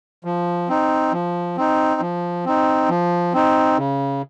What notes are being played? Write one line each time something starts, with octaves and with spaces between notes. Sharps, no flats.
F3
C4 D#4
F3
C4 D#4
F3
C4 D#4
F3
C4 D#4
C#3